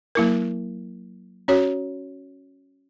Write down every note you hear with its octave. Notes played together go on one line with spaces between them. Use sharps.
F#3 A#3 E4 A#4
C#4 F#4 C#5